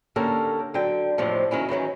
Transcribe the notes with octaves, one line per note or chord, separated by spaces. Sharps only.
D3 A#3 C#4 G4 A4 A#4
D3 F#3 G5
F2 A2 C3 D#3 F3
D#3 F#3 C#4 E4
D#3 E3 F#3 C#4